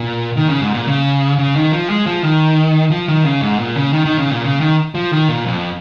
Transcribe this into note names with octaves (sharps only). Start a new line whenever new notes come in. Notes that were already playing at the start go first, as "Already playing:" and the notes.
Already playing: A#2
D#3
C#3
G#2
A#2
C#3
C#3
D#3
F3
G#3
F3
D#3
F3
D#3
C#3
G#2
A#2
C#3
D#3
D#3
C#3
A#2
C#3
D#3
F3
D#3
A#2
F2